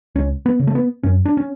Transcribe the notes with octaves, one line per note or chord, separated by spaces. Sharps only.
C#2 C#4
B3
C#3
A3
B3
F#2 C#4
D4
C#4